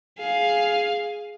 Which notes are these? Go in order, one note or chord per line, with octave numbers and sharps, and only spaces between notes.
G#4 F5